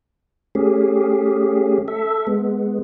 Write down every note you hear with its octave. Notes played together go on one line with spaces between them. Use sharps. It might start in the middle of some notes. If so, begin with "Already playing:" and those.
A3 C#4 G4 G#4
A4 E5
G#3 B3